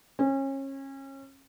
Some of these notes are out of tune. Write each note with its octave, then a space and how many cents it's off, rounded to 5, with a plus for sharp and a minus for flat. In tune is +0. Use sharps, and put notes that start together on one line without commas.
C#4 -30